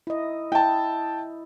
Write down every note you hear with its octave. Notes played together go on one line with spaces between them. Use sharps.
E4 D#5
E4 G5 A5